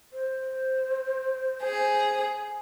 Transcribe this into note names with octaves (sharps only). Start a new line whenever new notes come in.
C5
G#4